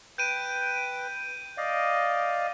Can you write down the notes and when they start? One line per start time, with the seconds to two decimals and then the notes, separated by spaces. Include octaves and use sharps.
0.18 B4 G5 G6 D7 D#7
1.57 D5 D#5 F5